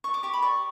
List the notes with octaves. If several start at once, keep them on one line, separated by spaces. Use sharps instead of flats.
D5 C#6
D6
G4 C#6
B5
D5 C#6